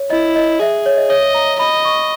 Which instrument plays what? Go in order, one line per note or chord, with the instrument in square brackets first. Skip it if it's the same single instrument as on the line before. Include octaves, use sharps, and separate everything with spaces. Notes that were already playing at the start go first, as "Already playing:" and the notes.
Already playing: [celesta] C#5
[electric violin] E4 [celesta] D#5
[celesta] D#5
[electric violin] G#4 [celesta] E5
[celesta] C#5
D#5
[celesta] C#5 [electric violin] D#5
[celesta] A#5
[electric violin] D#5 [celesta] B5
[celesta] C#6